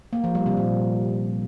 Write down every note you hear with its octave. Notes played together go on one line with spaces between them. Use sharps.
A#3
F3
G3
C3
A#2